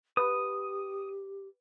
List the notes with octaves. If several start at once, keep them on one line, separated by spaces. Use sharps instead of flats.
G4 B4 D#6